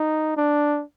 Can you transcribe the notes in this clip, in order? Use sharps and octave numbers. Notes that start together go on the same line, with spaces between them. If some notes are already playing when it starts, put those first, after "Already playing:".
Already playing: D#4
D4